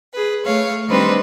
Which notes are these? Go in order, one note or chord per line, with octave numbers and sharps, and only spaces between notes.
G#4 B4
A3 C#5 F5
D#3 G3 C4 D4 B4 C5